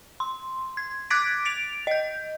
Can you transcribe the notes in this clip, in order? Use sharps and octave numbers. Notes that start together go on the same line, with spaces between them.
C6
G#6
D6 F#6 G#6 A6 B6 D7
A6 D7 F7
D#5 G6